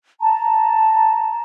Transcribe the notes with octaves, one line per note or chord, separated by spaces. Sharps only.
A5 A#5